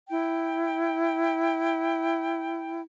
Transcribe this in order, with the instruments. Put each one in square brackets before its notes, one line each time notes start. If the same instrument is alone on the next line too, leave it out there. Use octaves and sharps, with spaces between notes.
[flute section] E4 G5